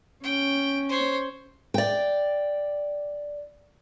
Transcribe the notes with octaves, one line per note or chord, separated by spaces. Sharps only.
C#4 G5
C5 C#5
D5 G5